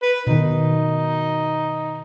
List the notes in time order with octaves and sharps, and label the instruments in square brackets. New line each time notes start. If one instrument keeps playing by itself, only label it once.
[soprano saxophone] B4
[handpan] B2 D#3 [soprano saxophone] D#4